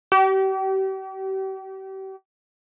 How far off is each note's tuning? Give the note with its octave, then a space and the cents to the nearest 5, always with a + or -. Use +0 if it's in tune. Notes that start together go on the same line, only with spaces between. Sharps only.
G4 -40